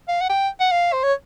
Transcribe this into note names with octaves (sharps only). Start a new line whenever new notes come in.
F5
F#5
G5
F#5
F5
C5
C#5